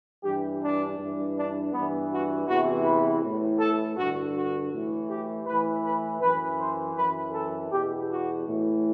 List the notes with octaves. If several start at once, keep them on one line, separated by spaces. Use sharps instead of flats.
G2 E3 G4
D4
G2 E3
D4
G2 E3 B3
F#4
E2 C3 E3 F#4
B4
A2 E3
A4
G2 D3 F#4
F#4
A2 E3
G4
A2 E3 B4
B4
F#2 E3 B4
C5
F#2 E3 B4
A4
E2 B2 G4
F#4
A2 E3